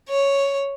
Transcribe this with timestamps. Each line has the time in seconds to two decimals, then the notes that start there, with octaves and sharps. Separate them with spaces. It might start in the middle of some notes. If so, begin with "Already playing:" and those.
0.09 C#5